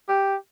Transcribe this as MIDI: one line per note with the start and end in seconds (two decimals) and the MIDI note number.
0.08 0.36 67